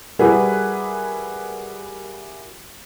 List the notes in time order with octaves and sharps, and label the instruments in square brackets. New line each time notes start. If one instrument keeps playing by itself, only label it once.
[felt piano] G3 E4 F#4 G#4 A#4 B4